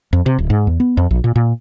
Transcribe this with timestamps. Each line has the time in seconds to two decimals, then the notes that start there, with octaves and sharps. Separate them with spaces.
0.13 F2
0.26 C3
0.38 D1
0.50 G#2
0.67 E2
0.80 B3
0.97 F2
1.11 A#1
1.24 A#2
1.36 A#2